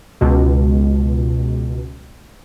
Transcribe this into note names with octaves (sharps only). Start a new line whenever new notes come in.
C#2 B2